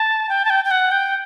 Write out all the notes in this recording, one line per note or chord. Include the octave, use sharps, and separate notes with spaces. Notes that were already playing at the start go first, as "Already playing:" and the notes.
Already playing: A5
G5
A5
G5
G5
F#5
G5